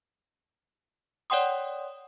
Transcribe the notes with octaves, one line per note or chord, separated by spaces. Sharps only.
C#5 D5 F#5 G5 C6 D#6